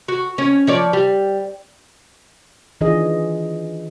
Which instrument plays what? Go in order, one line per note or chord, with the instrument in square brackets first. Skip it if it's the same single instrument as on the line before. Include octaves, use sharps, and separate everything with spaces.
[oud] F#4
C#4
F3 C#5 D5
G3
[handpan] D#3 E3 D4 F4 G#4 D#5